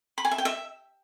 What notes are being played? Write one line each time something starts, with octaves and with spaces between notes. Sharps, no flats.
B5
G#5
E5
G5
E5